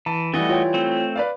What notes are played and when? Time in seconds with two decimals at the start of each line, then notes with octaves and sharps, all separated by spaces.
0.06 E3 A5
0.34 E3 G3 A3 F#4 D#5 A6
0.49 F4 C#5 G5
0.74 A3 C4
1.16 B4 D5 F5